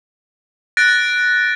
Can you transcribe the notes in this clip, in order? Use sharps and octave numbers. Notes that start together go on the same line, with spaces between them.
F#6 A6 A#6 D7